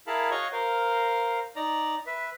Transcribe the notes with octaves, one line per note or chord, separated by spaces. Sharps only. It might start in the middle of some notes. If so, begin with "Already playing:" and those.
E4 G#4 A#4 F5 A5 B5
F#4 C#5 D#5 F5 C#6
A#4 C5 F5
D#4 D5 A#5
B4 E5